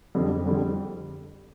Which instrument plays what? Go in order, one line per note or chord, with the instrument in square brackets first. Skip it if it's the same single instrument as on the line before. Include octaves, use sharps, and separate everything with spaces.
[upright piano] F2 D3 G3 C4 G4
F2 D3 G3 C4 G4